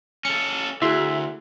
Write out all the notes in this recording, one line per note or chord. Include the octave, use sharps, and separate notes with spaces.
C#4 A4 C#7
D2 E4 F#4 G#4 E5 C6